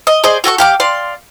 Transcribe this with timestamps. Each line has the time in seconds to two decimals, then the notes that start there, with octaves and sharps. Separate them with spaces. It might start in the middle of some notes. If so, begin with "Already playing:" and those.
0.07 D#5
0.24 G#4 C5 D5 D#5
0.44 F#4 A4 F#5 C#6
0.58 G4 F5 D6
0.80 D5 F5 C6